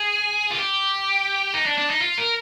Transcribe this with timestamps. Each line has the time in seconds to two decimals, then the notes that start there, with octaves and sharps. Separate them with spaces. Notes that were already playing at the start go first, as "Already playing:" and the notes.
Already playing: G#4
0.51 F4
0.58 G4
1.54 D#4
1.66 D4
1.78 D4
1.90 D#4
2.02 F4
2.18 A#4